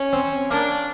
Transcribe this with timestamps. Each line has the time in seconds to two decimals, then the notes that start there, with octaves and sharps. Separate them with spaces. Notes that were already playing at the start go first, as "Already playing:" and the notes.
Already playing: C#4
0.13 C4
0.51 A#3 D4